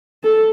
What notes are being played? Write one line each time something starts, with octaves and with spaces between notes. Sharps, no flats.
A4